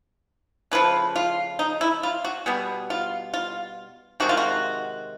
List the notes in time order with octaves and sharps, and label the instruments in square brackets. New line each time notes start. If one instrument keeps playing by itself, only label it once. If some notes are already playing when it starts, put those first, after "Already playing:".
[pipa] C#3 F3 A3 B4
F4
D#4
E4
F4
F#4
B2 G3 B3 G#4
F4
F4
C3 D#3 G#3 F#4
F4
F#4